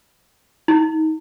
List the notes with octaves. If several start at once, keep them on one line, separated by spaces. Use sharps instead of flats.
D#4